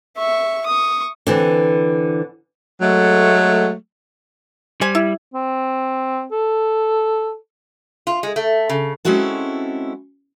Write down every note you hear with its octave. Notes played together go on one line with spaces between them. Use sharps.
E5 C#6
C#6 D#6
D3 E3 C4
F#3 G#3 A3
G3 C5 G#5
E4
C4
A4
F4
G#3
A3
C#3
G#3 C4 C#4 E4 F#4 A4